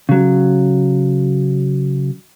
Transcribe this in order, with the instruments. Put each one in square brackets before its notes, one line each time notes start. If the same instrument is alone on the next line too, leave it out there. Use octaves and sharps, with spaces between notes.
[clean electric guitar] C#3 F#3